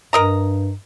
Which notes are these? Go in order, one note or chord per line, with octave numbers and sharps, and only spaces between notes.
G2 A#4 D#5 A#5